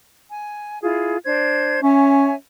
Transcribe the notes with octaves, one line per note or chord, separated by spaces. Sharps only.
G#5
E4 F4 G#4
D4 C5 G#6
C#4 C#5 E5 G#5